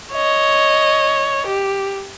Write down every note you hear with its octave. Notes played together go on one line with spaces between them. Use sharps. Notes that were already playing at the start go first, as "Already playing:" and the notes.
C#5 D#5
G4